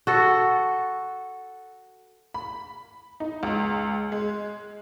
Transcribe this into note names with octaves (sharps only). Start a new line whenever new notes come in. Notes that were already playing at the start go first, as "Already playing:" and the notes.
F#4 A4
B5
D#4
C#2
G#3